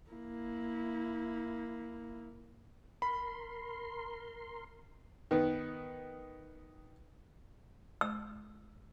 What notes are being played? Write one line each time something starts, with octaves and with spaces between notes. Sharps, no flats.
A#3 E4
A#4 B5 C6
D#3 B3
E6